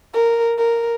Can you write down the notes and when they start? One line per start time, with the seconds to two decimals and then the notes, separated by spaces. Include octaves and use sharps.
0.14 A#4
0.58 A#4